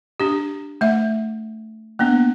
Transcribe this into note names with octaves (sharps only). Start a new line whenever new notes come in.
D4 G4
A3 E5
A#3 B3 D4